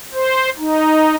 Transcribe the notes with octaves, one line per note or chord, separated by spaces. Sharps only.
C5
D#4